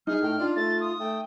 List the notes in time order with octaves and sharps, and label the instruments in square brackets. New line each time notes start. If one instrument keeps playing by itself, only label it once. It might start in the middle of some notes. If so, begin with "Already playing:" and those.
[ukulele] D#4 [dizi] G#4 [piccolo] F6
[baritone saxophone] A2 [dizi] G5
[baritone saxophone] D4 [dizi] F4
[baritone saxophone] A3 [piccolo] A6
[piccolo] D#6
[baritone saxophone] A3 [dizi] G5